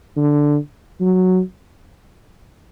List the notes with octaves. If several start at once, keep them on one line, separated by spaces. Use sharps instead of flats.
D3
F#3